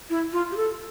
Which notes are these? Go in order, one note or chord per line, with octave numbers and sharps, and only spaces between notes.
E4
F4
G4
A4